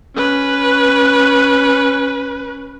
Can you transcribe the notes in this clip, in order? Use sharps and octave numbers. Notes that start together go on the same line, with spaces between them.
C#4 B4